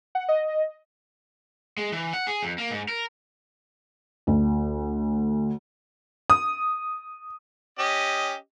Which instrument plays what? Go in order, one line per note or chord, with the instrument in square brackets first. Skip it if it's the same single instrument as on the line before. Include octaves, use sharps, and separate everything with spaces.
[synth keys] F#5
D#5
[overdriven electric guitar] G#3
E3
F#5
G#4
F2
A#3
G#2
A#4
[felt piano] D2
[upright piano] D#6
[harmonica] C#4 G4 D#5